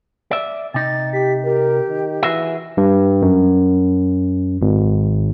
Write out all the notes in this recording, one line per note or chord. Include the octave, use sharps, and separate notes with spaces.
D5 E5
C3 D#4 A6
G4 B6
G4 A#4
D#3
E3 F#4 G#4 E5
G2
F#2
G#1